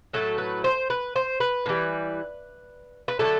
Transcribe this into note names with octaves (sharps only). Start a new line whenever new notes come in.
A2 F#3 A3 A4
B4
C5
B4
C5
B4
A2
E3 G3
B4
D3 F#3 A3 A4